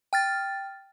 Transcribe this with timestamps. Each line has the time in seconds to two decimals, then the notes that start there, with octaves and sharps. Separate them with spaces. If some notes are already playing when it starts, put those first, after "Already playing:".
0.13 G5 F6 A6